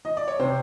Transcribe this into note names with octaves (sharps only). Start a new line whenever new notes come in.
D#5
D5
C#5
C3 C5